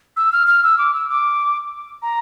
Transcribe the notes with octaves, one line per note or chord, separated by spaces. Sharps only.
E6
F6
F6
E6
D6
E6
D6
A#5